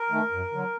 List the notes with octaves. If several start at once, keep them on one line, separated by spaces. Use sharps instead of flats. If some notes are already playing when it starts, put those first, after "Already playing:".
Already playing: A#4
D#3 A3
F#2
D3 F#3